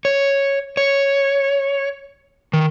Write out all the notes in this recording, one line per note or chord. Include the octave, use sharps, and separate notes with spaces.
C#5
C#5
D#3